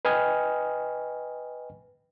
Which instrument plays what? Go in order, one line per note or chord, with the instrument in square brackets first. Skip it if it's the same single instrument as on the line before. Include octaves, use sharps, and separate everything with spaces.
[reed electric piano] B4 D#5 G5 G#5 D#6 F6